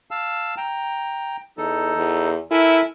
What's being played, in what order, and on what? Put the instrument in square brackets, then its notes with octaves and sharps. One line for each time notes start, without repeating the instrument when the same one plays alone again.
[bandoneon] F5 A5 E6
G5 A#5
[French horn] E2 [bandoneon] D#4 A4
[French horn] E2
[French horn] E4 [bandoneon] A4 A#4 G#5